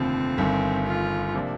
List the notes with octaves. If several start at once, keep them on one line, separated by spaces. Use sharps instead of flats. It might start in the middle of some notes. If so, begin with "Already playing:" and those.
Already playing: F1 D#2 D3 F3 C4
G1 G2 D#3
F4
C3 F3 A#3 D4